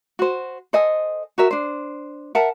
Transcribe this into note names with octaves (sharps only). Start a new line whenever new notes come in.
F#4 C5
A4 C5 D#5 G#5
F#4 A#4 E5
D4 C5
A#4 E5 F#5 A5